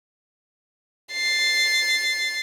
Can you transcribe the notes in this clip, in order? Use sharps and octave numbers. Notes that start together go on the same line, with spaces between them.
A6 C7